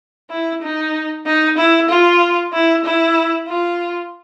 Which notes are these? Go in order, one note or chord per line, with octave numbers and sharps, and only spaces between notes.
E4
D#4
D#4
E4
F4
E4
E4
F4